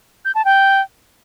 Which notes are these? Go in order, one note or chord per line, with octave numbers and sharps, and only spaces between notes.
G6
A5
G5